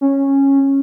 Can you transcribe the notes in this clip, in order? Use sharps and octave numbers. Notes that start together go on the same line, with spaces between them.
C#4